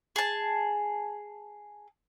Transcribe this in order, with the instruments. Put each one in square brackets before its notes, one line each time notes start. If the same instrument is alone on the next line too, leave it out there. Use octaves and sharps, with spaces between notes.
[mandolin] G#4 A5